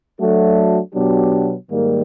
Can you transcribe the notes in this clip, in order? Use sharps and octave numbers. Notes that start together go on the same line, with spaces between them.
F#3 A3 D4 F#4 A4
B2 F#3 B3 D4 G4
G#2 D#3 G3 A#3